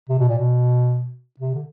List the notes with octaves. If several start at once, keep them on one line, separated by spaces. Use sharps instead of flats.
C3
B2
A#2
B2
C3
D3